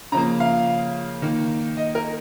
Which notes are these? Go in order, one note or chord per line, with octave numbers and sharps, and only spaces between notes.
C#3 F3 A#3 A#5
F5
D#3 A#3
D#5
A#4